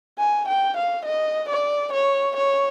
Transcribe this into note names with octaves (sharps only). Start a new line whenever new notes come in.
G#5
G5
F5
D#5
D5
C#5
C#5